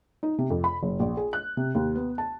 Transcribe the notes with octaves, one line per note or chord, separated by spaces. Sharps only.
D#4
C3
F2
B5
F#1
A#1
G#4
F#6
C3
D#2
B3
A5